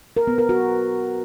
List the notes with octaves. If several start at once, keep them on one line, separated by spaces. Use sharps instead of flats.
A#4
B3
A#4
F#4